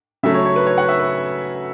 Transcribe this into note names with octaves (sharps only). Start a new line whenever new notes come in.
C#3 F#3 A3 C#4 E5
C#5
C#5
B4
C#5
F#5
E5
B4